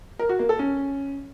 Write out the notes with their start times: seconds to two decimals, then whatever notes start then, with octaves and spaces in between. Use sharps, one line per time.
0.19 A#4
0.29 F#4
0.39 A#3
0.49 A4
0.59 C#4